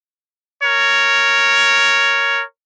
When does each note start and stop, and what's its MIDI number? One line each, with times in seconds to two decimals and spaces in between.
0.63 2.42 70
0.63 2.42 73